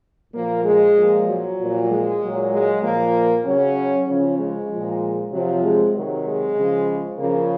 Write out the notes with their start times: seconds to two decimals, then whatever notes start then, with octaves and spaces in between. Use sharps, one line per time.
0.34 A#2 F3 A#3
0.64 G#3
0.97 A#2 F3
1.28 F#3
1.59 A#2 F3
1.89 G#3
2.20 A#2 F#3
2.52 G#3
2.83 A#2 F3 A#3
3.45 C#3 F#3 C#4
4.08 C#3 F3 C#4
4.39 G#3
4.70 A#2 F3
5.31 C3 F3 F#3
5.63 G#3
5.95 C3 D#3 F#3
6.25 G#3
6.56 C#3 F3
7.18 C#3 F3 A#3